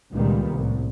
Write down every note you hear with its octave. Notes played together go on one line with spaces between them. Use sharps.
C#2 A#2 D#3 G3 B3
C2 A2